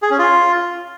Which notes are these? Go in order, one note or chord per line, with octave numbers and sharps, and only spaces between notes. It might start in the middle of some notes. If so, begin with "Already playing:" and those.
G#4
C#4
F4